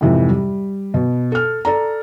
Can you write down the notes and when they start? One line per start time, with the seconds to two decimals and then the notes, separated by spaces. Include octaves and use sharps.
0.01 F2 G#2 C3 E3 F3
0.29 G3
0.94 B2
1.32 A4 F6
1.65 A4 D5 A#5